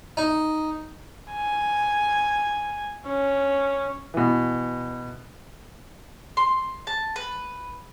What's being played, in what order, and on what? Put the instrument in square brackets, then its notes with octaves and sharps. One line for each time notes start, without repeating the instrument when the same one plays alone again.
[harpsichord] D#4
[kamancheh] G#5
C#4
[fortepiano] B2 E3
[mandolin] C6
A5
B4